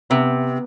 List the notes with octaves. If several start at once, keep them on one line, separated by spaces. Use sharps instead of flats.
C3 B3